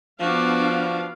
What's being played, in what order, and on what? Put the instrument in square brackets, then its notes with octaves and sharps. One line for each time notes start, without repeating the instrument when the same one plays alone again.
[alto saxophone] F3 [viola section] B3 D4 F5 [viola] F#4 D6